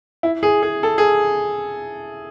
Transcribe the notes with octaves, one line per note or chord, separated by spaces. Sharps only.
E4
G#4
G#4
A4
G#4